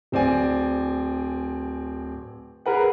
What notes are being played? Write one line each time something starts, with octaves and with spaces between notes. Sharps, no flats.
D1 C4 D5 G#5
G#4 A#4 B4 F#5